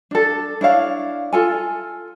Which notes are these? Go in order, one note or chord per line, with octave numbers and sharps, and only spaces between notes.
D4 A4
D4 E4 C#5 F5
F4 A4 G#5